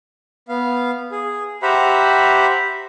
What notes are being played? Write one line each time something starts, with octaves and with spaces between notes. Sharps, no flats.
B3 F5
G#4
G4 C5 E5 F#5 A#5 B5